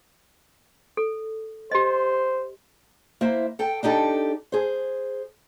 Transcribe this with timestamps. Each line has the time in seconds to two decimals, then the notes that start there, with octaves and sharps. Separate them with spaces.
0.97 A4
1.72 G4 C5 D#5
3.21 A#3 E4 C5 E5
3.59 A4 G5
3.83 D4 D#4 G4 A4
4.52 G#4 C5